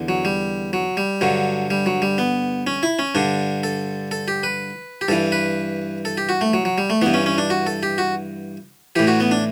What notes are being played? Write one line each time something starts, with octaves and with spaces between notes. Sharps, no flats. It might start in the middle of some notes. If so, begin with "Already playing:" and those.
Already playing: E2 D3
F#3
G3
F#3
G3
G2 D3 F#3
G3
F#3
G3
B3
C#4
E4
C#4
G2 D3 D4
A4
A4
G4
B4
G4
G2 E3 A4
B4
A4
G4
F#4
A3
F#3
F#3
G3
A3
G2 E3 B3
C#4
C#4
D4
F#4
A4
G4
F#4
A2 E3 G4
F#4
B3
D4